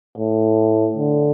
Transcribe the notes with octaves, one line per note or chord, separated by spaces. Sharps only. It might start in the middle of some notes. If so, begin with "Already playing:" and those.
A2
D3